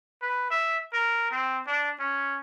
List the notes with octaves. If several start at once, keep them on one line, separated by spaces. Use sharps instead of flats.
B4
E5
A#4
C4
D4
C#4